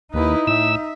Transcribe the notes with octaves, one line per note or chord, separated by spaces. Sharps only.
D#2 D#4 E4 B4
A2 E5 E6